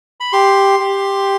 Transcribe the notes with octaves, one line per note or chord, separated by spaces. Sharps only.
B5
G4 C6
G4